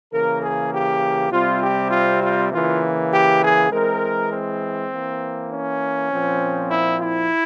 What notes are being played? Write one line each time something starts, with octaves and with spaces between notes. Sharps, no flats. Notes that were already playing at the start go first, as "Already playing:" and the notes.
C#3 E3 A#3 A#4
G#4
G4
C3 G3 C4 F4
G4
F4
F4
C#3 E3 A#3 F4
G4
G#4
E3 G#3 C4 A#4
C4
E3 A#3
C#4
A#2 F3 C4
E4
E4